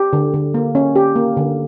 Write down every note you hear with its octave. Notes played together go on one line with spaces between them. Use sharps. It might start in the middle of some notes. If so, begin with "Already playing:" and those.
Already playing: G4
D3
D3
A#3
C#4
G4
A#3
D3